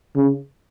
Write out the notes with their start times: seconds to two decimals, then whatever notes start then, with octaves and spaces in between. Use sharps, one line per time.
0.16 C#3